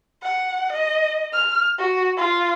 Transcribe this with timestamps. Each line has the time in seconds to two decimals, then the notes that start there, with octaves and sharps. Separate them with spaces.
0.23 F#5
0.73 D#5
1.33 F6
1.78 F#4
2.17 F4